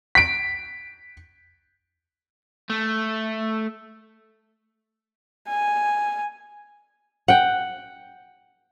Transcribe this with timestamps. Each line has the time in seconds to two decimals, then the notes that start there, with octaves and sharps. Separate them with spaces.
0.15 B6 D7
2.70 A3
5.49 G#5
7.28 F#5 G5